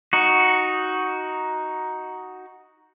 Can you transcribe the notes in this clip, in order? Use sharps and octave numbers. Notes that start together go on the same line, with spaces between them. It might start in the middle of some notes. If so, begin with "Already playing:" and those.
D#4 F#4